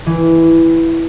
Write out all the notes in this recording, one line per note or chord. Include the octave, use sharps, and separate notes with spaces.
E3